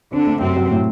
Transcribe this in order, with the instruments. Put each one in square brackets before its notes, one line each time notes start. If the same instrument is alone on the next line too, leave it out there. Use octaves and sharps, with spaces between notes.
[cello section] D3 D4 [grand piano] C4
[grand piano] A3
[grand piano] F#2 [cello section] C3 C4
[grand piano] F#3
A2